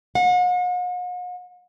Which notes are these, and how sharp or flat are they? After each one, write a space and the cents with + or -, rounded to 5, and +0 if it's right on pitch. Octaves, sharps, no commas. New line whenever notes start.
F#5 -45